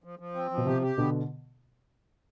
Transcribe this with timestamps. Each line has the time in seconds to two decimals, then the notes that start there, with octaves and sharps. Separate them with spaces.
0.04 F3
0.19 F3
0.35 C4
0.51 F3
0.58 B2
0.66 C3 G4
0.82 G4
0.97 B2 D3 B3